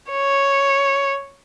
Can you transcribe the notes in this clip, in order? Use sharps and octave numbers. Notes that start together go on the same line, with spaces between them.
C#5